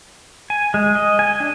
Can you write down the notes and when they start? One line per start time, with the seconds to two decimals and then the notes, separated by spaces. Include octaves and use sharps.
0.50 G#5
0.74 G#3
0.95 D#5
1.19 G#5
1.40 D4